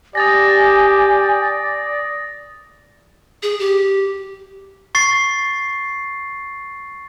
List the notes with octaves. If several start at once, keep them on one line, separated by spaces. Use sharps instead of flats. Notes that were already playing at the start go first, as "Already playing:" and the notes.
G4 D5 G#5 D#6 A6 A#6
G#4
G4
C#6 A6 C7